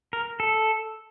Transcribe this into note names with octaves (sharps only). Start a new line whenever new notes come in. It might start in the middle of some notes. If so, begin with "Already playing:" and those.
A#4
A4